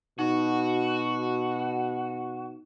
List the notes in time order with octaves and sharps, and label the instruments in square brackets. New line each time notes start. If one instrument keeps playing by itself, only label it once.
[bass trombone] B2 [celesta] D#4 [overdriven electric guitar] F#4